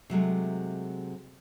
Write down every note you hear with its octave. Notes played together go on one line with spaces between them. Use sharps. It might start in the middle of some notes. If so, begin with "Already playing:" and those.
C3 F#3 G#3 A3